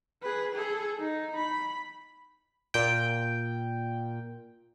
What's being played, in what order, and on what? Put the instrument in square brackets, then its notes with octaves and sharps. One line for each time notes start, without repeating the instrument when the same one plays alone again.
[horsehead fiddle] G#4 B4
G#4 A4
D#4
B5
[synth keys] A#2 G5